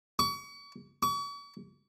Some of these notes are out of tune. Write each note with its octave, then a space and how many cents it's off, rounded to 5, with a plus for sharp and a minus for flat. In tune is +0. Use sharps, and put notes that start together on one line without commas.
C#6 +35
C#6 +40